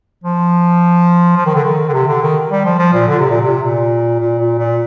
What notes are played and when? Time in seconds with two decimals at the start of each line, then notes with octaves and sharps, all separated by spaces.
0.24 F3
1.37 F3
1.46 D#3
1.55 D3
1.65 D#3
1.89 D3
1.93 C3
2.08 D3
2.22 D#3
2.50 G3
2.65 F3
2.79 F3
2.93 A#2
3.07 D3
3.19 C3
3.30 A#2
3.41 C3
3.63 A#2
4.20 A#2
4.39 A#2
4.58 A#2